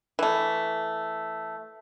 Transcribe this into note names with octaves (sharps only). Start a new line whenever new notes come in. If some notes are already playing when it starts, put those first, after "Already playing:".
E3 A3